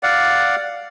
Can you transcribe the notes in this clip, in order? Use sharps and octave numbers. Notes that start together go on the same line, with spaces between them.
D5 F5 F#5